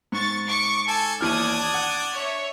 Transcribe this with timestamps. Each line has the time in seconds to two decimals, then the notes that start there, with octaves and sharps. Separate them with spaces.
0.12 G#2 C#6 A6
0.46 C#6 D6 C#7
0.87 A4 G#5 A5
1.21 D#2 E3 D4 D5 D#6 F6 G#6
1.74 F#5
2.13 C#5 E5